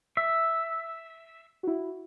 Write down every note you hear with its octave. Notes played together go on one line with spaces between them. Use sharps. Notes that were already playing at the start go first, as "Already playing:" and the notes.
E5
E4 F#4